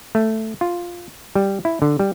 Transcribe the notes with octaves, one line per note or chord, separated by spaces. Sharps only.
A3
F4
G3
E4
D3
G3